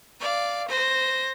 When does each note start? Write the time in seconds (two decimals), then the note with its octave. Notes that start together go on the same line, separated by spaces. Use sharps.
0.20 D5 F5
0.68 C5 A#6